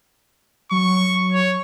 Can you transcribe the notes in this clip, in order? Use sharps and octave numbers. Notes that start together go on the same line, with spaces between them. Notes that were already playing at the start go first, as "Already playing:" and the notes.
F#3 C#6
C#5